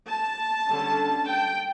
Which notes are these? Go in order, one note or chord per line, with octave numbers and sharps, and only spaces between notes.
A5
D3 G3 C#4
G5